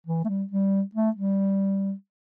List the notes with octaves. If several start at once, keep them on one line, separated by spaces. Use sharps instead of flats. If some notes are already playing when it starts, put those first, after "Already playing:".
E3
A3
G3
G3
A3
G3